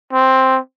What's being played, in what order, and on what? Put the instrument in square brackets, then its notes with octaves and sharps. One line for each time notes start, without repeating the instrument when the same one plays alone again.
[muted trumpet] C4